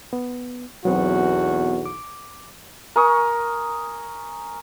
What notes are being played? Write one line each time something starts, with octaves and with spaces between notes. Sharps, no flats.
B3
B1 E2 F#3 B3 C4 F#4
D6
A#4 G#5 C#6 D#6